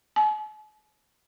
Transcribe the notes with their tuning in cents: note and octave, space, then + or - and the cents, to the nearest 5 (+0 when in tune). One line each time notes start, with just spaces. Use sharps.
G#5 +45